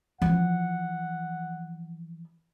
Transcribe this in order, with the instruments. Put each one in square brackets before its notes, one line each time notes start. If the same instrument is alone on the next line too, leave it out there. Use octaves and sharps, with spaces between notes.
[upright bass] E3 F3 [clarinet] F#5